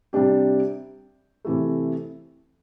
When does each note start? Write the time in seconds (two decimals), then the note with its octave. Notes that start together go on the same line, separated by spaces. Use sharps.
0.13 C3 G3 D4 G4
1.45 C3 E3 A3